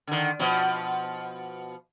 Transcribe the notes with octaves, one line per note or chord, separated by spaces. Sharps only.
D3 D#3
B2 F3